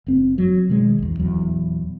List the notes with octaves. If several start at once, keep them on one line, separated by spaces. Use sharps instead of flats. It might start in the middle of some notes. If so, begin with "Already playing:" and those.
F#1 C4
F#3
B2 D#3 G#3
A#1 E2
D#1 E2 F#3